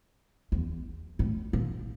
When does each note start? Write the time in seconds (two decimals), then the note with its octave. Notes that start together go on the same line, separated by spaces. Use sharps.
0.52 E2
1.19 A2
1.53 A#2